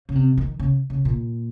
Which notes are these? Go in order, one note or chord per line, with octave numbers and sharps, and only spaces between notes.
C#3
C3
D#3
C#3
C#3
A#2